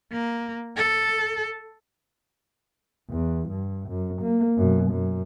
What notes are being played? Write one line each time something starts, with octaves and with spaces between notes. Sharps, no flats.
A#3
A4
E2
G2
F#2
A#3
F#2 B2
F#2